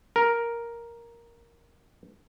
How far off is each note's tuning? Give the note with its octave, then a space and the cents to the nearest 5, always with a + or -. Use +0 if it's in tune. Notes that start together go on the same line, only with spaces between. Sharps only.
A#4 +5